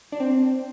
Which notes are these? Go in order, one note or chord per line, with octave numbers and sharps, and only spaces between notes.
D4
C4